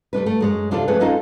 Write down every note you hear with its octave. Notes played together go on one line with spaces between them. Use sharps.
G3 A3 D4 B4
A3
F#2 G#3 C#5
C3 D4 E4 F4 G4 A4
F3 A3 C#4 D4 G#4 B4
C4 C#4 D#4 F4 A4